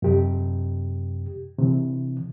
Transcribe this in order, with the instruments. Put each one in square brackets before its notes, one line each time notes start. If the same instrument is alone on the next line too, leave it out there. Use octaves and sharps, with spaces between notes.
[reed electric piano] F#2 C3 G4
C3 E3